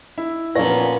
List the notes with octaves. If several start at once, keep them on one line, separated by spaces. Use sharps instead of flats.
E4
A#2 F3 B3 C#4 C#5 A#6